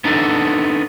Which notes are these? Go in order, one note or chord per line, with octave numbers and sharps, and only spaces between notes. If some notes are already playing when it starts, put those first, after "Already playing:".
B3 D4 D#4 A4